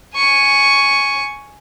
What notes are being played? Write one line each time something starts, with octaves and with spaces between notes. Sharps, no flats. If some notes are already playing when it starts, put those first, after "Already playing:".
G#5 C#6